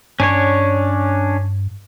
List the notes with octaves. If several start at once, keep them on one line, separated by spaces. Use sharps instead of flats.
G2 C#4 D4 C#5